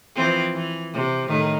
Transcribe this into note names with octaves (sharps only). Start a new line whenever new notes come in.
E3 F3 C4
E3
C3
A2 D#3